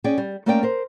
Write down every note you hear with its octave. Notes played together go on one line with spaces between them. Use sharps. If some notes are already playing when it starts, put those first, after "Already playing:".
C#4 G#4 D5 G5
G3
A3 A#3 C#4 A#4 D5 G5
A#4 C5